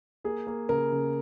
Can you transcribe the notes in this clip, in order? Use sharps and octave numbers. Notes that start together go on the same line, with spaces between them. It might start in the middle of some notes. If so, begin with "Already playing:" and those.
A#3 G#4
A#3
C#3 A#4
C#3